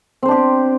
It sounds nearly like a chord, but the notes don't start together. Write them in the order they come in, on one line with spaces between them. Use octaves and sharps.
C4 C5 D4 G4